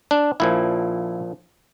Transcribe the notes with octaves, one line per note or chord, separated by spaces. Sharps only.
D4
A#1 A#2 F3 E4